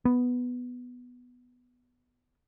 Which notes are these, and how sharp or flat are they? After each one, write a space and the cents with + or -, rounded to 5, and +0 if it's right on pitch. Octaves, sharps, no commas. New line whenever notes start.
B3 +0